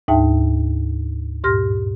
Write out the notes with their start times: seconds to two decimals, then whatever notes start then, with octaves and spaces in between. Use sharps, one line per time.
0.08 D2 G#2 D#4 E5 G5 A5
1.44 G2 A#2 G4 C6 F6 A#6